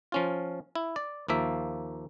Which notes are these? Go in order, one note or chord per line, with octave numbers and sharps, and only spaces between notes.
F3 C#4 F4
E4
D5
D#2 F3 A#3 E5